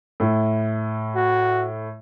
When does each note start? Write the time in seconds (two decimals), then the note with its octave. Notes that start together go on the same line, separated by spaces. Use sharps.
0.20 A2 E4
1.15 F#4